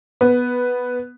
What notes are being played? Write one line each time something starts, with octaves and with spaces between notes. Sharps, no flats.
B3